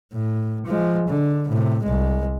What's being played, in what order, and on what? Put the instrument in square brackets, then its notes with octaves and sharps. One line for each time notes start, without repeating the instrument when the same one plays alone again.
[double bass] A2
F3 G#3
D3
A2 C3
C2 G#3